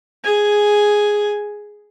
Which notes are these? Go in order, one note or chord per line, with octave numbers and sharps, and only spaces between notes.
G#4 G#5